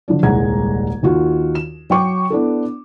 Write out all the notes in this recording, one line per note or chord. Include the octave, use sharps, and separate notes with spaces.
D3 F3 F#3 D4
D#1 C2 G#3 F#5 A#5 G#6
D#2 D#3 F4 F#4
E7
F#3 G5 C#6 D6
B3 D4 E4 A4